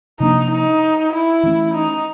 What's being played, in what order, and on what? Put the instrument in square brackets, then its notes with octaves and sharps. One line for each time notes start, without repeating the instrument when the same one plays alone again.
[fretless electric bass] C3 F3 A#3 D4 [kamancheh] D#4
[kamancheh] D#4
E4
[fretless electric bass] E3 A3 C#4
[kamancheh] D#4